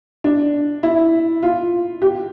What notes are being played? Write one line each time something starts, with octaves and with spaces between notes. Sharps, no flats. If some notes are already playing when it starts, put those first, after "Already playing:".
D4
E4
F4
G4